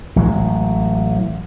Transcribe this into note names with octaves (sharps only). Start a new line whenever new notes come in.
A1 F#3 G#3